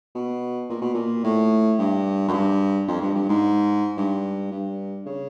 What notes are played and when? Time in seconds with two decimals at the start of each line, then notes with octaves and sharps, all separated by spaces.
0.15 B2
0.69 A#2
0.81 B2
0.94 A#2
1.24 A2
1.79 G2
2.28 F#2
2.33 G2
2.88 F2
3.02 G2
3.15 G2
3.29 G#2
3.97 G2
4.51 G2
5.06 C#3